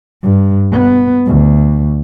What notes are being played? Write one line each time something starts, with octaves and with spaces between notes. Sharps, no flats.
G2
B3
D2